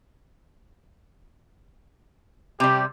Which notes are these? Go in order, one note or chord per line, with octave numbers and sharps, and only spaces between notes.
C3 G3 G4